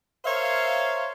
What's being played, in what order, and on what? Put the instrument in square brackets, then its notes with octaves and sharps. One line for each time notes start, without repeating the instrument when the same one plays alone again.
[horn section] A#4 C5 C#5 E5 F5